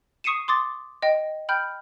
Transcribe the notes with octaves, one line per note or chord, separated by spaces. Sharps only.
C#6 D#6 C7 C#7 D#7 E7
C6 D6 D#6 A6
D#5 G5
G5 B5 F6 G6